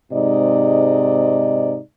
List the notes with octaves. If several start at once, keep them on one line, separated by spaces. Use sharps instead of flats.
G#2 C3 G#3 D#4 D5 D#5